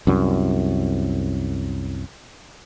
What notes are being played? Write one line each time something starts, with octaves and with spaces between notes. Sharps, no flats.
C2 F#2